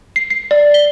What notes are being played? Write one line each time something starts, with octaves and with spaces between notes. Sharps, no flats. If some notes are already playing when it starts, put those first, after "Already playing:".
C7
C7
D5
G7